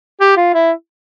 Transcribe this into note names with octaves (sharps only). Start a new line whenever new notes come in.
G4
F4
E4